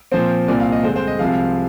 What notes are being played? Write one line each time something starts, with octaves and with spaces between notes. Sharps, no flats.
A#2 F3 C4 C5
C2 A#2 F3 D5
F5
D#5
G2 D3 G#3 C4 C5
C5
D#5
C2 C3 F3 G#3 F5